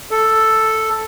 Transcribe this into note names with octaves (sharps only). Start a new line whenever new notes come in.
A4